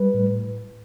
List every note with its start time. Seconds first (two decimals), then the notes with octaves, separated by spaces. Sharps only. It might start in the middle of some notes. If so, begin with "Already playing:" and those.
Already playing: G3 B4
0.14 A2